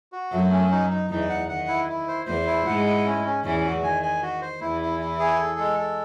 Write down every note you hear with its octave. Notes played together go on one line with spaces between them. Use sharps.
F#4
F#2 F#3 A3
C#4
D#4
D#4
E2 E3 D#4
F#5
D#3 F#5
E4
E4
C5
E2 E3 C5
E4
G#2 G#3 F#5
E4
C#4
C#4
E2 E3 C#4
F#4
D#3 G#5
G#5
F#4
C5
E2 E3 E4
E4
E4
G#4
A4
G#3
A4